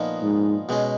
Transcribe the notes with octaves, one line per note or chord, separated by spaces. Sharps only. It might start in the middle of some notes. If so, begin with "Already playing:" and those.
Already playing: A#2 F3 B3 D#4
G#2
B2 G#3 C#4